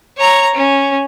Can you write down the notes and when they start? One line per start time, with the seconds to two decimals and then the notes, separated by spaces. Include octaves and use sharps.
0.17 C#5 A#5
0.55 C#4